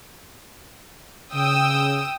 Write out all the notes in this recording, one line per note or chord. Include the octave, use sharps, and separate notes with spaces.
C#3 G5 D#6 E6